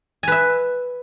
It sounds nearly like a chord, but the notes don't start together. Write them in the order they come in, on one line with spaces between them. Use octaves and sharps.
G#5 B4 E5